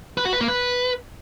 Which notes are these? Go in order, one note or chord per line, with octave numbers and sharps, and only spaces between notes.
B4
F#4
B4
A#3
B4